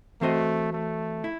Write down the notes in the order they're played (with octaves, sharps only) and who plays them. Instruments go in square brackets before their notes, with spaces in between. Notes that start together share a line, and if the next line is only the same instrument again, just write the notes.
[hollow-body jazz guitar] E3 C4 F#4 C5 D#5 [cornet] A3
[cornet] A3
[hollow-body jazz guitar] E4